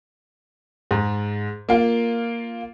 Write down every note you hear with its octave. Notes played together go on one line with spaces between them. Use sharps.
G#2
A#3 F4